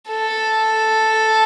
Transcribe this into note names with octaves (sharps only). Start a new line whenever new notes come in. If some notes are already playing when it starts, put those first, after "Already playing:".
A4